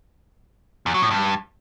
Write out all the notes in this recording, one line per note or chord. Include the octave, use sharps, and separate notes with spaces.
E2
F#3
A2
G2